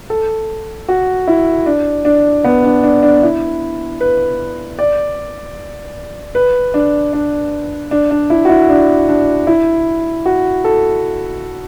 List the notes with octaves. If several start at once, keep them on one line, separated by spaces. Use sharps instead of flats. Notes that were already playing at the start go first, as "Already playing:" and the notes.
A4
F#4
E4
D4
D4
B3
D4
D4
D4
E4
B4
D5
B4
D4
D4
D4
D4
E4
F#4
E4
D4
D4
E4
F#4
A4